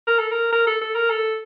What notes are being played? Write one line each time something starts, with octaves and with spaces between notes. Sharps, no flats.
A#4
A4
A#4
A#4
A4
A4
A#4
A4